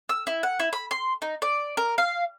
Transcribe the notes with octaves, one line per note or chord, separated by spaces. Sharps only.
E6
E4
F#5
E4
B5
C6
D#4
D5
A#4
F5